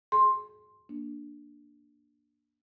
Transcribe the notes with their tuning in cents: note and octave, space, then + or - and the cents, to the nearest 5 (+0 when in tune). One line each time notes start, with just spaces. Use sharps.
G#4 +35 C6 +10
A#3 +0 D4 +0